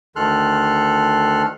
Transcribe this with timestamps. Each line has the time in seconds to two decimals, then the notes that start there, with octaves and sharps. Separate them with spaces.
0.16 D2 D#3 A4 C6 F6 F#6